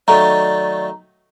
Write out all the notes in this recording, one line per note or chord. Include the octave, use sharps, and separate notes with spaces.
D#3 F#3 A3 D5 A#5